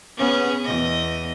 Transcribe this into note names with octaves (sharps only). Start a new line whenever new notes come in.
B3 C#4 G#4
E2 D#5